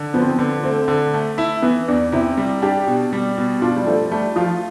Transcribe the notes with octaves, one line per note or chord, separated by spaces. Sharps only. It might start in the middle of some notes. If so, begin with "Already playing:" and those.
Already playing: D3
F3 B3
C4
B3
D3
A3 C4
D3
A3
E4
E3 B3
E2 D4
C3 E4
G3
D4 G4
B2
G3
B2
D4 F4
G3
F3 A3
G3 A3
F3 F4